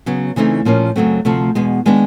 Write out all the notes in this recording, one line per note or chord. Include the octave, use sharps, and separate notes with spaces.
C#3 F#3 B3
C#3 E3 A3 C4 D#4
A#2 F3 A#3 C#4
F#2 C#3 F#3 A3 C4
D2 C3 F3 A3
E2 B2 G#3
D#3 G#3 B3 D4